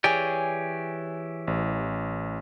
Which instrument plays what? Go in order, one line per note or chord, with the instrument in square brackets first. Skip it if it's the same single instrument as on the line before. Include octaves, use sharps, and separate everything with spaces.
[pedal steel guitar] E3 G4 D5 [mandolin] G#4 C#5
[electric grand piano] A1